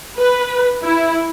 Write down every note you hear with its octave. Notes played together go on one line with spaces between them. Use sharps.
B4
E4